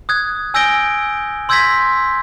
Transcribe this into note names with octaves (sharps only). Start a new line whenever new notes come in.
D#6 F#6 G#6
G#5 E6 G6 A#6 D7 G7
C6 E6 G6 G#6 A#6 B6